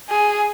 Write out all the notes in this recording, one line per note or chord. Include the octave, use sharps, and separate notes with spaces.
G#4